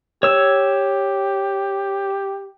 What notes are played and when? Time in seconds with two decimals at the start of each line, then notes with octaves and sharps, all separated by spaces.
0.23 G4 C#5 E6